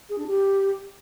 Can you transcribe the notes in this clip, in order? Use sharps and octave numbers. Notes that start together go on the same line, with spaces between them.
G#4
D4
G4